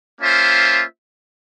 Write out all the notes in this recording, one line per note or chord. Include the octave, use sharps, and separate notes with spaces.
A#3 C#4 F4 C5 E5